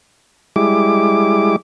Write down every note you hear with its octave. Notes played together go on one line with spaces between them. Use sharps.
G3 G#3 E4 D6